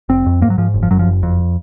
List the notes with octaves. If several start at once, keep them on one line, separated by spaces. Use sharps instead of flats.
F1 C4
F2
G#2 A#3
F#3
G#2 F3
F#1
F3
F#2 F#3
F3
F#1
F2